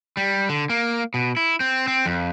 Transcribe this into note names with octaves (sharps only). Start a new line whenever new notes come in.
G3
D3
A#3
B2
E4
C4
C4
F2